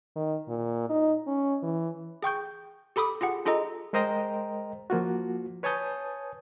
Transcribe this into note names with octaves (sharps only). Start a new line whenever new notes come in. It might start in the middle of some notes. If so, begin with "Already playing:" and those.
D#3
A#2
D#4
C#4
E3
G#4 G5 C#6 G6
G4 A4 B5 D6 D#6
F4 G4 G#4 F#5
D4 F4 G#4 A4 D#5 A#5
G#3 A#4 C5 D#5 G5 A#5
F3 A#3 F4 F#4
B4 C#5 G#5 A5 D#6 G6